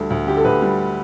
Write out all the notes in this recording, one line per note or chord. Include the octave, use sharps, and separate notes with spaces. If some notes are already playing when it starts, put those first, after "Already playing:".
Already playing: D2 G3 A4
D2
D3 G4
A4
D2 B4
G3